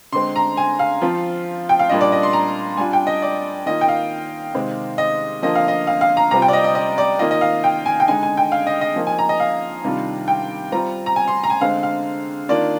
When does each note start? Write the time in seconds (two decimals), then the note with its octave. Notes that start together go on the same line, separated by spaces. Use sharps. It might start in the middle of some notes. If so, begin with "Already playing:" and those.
0.13 D3 G#3 C4 C6
0.36 A#5
0.57 G#5
0.79 F5
1.01 F3 C4 F4
1.69 G5
1.79 F5
1.89 A#2 G3 D4 F4 D#5
2.01 D5
2.12 D#5
2.23 C6
2.33 A#5
2.77 G3 D4 F4 G#5
2.93 G5
3.07 D#5
3.22 D5
3.66 D#3 A#3 F4 D#5
3.81 G5
3.88 F5
4.55 C3 D#3 G#3 C4
4.98 D#5
5.42 D3 F3 A#3 F4 D#5
5.55 F5
5.68 D#5
5.87 F5
6.01 F5
6.17 A#5
6.31 C3 G3 C4 F4 A#5
6.42 G5
6.48 D5
6.53 D#5
6.64 D#5
6.75 D#5
6.98 D5
7.19 D#3 A#3 F4 D#5
7.31 D#5
7.41 F5
7.64 G5
7.86 G#5
8.00 G5
8.08 D3 G#3 D#4 G#5
8.23 G#5
8.37 G5
8.52 F5
8.67 D#5
8.81 D#5
8.96 F3 A#3 D#4
9.07 G#5
9.19 A#5
9.29 D#5
9.40 F5
9.84 C3 D#3 G3 D4 F4
10.28 G5
10.72 G3 C4 F4 A#5
11.06 A#5
11.16 G#5
11.28 C6
11.44 A#5
11.50 G#5
11.61 D3 G#3 C4 F5
11.83 F5
12.49 D#3 A#3 D4 F4 D5